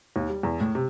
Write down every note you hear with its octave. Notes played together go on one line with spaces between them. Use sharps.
D#2
G3
E2
A2
C3